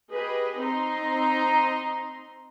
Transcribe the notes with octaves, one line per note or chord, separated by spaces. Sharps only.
G4 G#4 B4 D#5
C4 D#4 A#5 C6